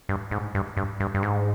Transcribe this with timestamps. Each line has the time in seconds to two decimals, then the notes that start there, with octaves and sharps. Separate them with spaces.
0.09 G2
0.31 G#2
0.55 G2
0.77 G2
1.00 G2
1.15 G2
1.23 G#2